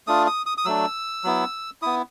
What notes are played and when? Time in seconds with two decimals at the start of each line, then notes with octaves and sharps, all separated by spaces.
0.07 A3 D4 F4 D#6
0.27 D#6
0.46 D#6
0.58 D#6
0.65 F#3 A3 D4 E6
1.24 F#3 B3 E4
1.82 B3 E4 D#6